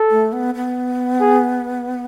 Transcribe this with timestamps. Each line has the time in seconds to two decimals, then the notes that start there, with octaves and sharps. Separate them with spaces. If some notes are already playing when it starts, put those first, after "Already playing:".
Already playing: A4
0.11 A3
0.32 B3
0.55 B3
1.21 G#4